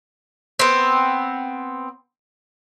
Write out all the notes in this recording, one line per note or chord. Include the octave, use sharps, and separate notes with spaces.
B3 C4